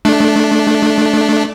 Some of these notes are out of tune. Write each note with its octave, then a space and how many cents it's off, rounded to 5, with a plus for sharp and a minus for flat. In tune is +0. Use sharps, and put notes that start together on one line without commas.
A3 -20 D4 +0